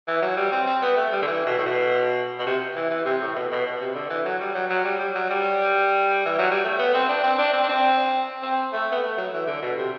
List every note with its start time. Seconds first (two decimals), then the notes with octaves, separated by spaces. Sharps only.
0.07 E3
0.22 F#3
0.37 G3
0.52 C4
0.66 C4
0.82 B3
0.96 A3
1.12 G3
1.22 D3
1.27 E3
1.46 B2
1.58 A2
1.66 B2
2.39 B2
2.46 C3
2.76 E3
2.90 E3
3.05 C3
3.21 A2
3.35 B2
3.51 B2
3.65 B2
3.76 B2
3.81 C3
3.95 D3
4.09 E3
4.25 F#3
4.40 G3
4.55 F#3
4.70 F#3
4.84 G3
4.99 G3
5.15 F#3
5.30 G3
6.25 E3
6.38 F#3
6.51 G3
6.64 A3
6.78 B3
6.94 C4
7.08 D4
7.23 C4
7.38 D4
7.53 C4
7.63 D4
7.69 C4
8.42 C4
8.72 A3
8.92 B3
9.03 A3
9.17 F#3
9.33 E3
9.47 D3
9.62 B2
9.77 C3